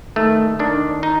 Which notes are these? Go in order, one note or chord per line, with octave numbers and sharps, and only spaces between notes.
D#3 A3
D#3 D4
D#4